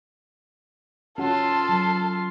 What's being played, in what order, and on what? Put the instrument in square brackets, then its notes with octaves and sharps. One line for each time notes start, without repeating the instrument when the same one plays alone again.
[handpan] C#4 F#4 F#5 [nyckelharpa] F4 C6 [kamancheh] A4
[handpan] F#3